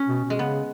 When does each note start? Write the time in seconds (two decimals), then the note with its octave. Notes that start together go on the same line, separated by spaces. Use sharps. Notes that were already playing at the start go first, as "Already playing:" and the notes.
Already playing: C#4
0.08 B2
0.24 B2
0.30 G#3
0.39 C#3 B3